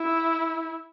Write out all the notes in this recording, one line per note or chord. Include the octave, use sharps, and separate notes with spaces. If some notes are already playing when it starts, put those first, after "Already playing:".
Already playing: E4